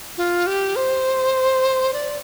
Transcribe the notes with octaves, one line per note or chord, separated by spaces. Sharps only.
F4
G4
C5
D5